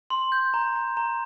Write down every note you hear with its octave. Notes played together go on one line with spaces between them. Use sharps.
C6
G6
A#5
A#5
A#5